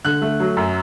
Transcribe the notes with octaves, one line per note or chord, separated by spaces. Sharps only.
D3 F#6
A3
F#3
F#2